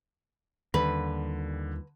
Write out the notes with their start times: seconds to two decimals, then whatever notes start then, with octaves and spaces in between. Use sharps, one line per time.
0.74 D#2 D3 D#3 G3 B4